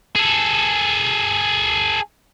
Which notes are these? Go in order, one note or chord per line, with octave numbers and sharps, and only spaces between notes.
G#4 A4